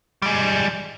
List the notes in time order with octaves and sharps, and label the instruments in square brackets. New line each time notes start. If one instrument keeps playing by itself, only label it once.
[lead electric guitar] G3 G#3